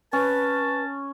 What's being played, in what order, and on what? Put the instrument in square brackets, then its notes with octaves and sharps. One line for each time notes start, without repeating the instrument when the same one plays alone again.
[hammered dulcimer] C#4 [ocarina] B4 [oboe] A5